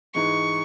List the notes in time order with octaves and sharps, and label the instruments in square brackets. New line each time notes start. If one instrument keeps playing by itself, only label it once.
[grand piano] G#2 E3 G#3 D#4 [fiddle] C#6